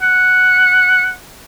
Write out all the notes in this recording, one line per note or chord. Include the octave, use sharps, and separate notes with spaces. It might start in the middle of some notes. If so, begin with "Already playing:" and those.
F#5